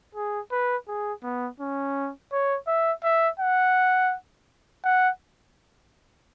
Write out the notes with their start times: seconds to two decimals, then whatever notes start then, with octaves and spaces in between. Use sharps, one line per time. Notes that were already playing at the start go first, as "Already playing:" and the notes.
0.15 G#4
0.51 B4
0.88 G#4
1.24 B3
1.60 C#4
2.32 C#5
2.67 E5
3.04 E5
3.40 F#5
4.84 F#5